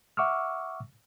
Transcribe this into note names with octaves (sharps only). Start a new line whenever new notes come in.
E5 F#5 C#6 D6 E6 F6